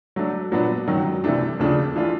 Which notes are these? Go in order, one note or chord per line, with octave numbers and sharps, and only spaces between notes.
F#3 A3 D4
A#2 F#3 B3 D4
F#2 D#3 F#3
C2 C3 E3 A3 D4
D#2 C#3 F3 A3 D4
E3 A3 D4 F4